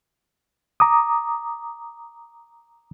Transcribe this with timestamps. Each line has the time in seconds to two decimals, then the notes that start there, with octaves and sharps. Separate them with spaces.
0.80 A#5 D6 D#6